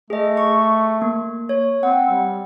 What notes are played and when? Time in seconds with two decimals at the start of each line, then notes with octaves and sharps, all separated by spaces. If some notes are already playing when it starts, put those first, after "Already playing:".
0.10 A3 G#4 D#5
0.37 C#6
1.02 A#3
1.49 C#5
1.83 C4 F#5
2.09 G3